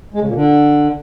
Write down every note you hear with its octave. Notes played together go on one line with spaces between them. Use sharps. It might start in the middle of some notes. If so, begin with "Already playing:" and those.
G#3
C#3
A#2
D3